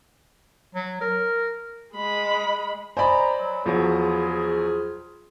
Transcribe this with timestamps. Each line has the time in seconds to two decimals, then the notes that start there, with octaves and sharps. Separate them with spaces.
0.75 F#3
1.01 A#4
1.94 G#3 B5
2.97 C5 D5 D#5 G#5 A#5 B5
3.38 F#3
3.65 E2 F3 F#3 F4 G#4